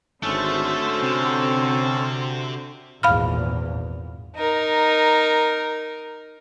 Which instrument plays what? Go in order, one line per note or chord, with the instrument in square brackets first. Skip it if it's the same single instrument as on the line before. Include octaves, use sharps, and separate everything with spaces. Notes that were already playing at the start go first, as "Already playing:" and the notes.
[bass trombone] G#1 [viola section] D3 F#4 C5 [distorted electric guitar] A3 [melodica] C#4 A4
[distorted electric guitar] C3 [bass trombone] C4
[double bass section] G#1 E2 A#2 [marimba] F5 B5 F6
[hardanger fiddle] D#4 A#4